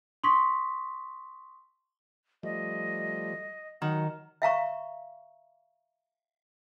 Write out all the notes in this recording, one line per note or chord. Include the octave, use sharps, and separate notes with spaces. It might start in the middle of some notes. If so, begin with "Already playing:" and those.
C6 C#6 D#6 B6
F3 G3 A3 D#5
D#3 F#3 F#5
E5 F5 A#5 C#6